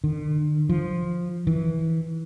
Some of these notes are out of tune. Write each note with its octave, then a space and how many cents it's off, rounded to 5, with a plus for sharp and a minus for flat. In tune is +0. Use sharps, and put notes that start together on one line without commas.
D3 +45
F3 +5
E3 -20